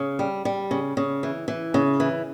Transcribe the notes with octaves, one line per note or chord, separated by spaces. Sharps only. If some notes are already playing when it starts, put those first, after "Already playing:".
Already playing: C#3
G3
G3
C#3
C#3
E3
E3
C#3
E3